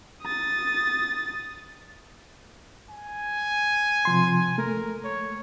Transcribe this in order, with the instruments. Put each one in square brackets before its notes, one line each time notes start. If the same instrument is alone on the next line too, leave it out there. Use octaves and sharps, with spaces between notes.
[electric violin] D#6 A6
[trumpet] G#5
[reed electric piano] C3 F3 C6
[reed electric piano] A3 [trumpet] A#4
[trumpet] C#5